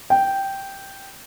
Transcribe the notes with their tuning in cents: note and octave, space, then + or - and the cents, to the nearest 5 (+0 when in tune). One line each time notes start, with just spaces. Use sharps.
G5 -5